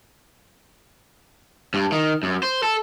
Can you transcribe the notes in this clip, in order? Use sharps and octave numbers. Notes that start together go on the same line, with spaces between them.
G2
D#3
F#2
C5
A4